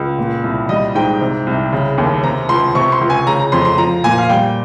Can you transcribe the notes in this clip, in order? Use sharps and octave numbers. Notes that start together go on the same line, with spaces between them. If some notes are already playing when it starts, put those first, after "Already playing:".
Already playing: C#2
A#2
C2
G3 D#5
G#2 G5
C3
C2
C#3
D#2
C3 A#5
C#2 C6
C3 C#6
C6
C#2
G#5
C#3 A#5
A#5
F2 C6
C6
F3 A#5
A#2 G#5
F5
G3 G5